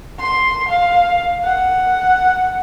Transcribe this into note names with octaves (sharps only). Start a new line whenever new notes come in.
C6
F5
F#5